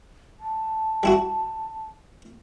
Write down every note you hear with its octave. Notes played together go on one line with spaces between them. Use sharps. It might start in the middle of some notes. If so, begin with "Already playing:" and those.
A5
G3 E4 F#4